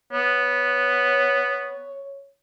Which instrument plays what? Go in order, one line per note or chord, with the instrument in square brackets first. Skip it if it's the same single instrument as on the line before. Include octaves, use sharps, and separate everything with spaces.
[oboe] B3 [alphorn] C#5